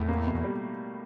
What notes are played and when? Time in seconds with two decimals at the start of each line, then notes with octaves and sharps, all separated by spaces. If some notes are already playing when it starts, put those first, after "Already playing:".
Already playing: E2 A2
0.08 A#3
0.27 B2
0.34 E2
0.44 G3